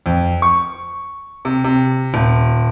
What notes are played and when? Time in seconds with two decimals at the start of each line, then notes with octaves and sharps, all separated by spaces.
0.06 F2
0.42 C#6
1.45 C3
1.64 C3
2.14 D#1